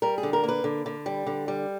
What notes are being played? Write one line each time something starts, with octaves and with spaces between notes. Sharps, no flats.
G3 A#4
G#4
D3
A#4
A#3 B4
D3
D3
G3
D3
G3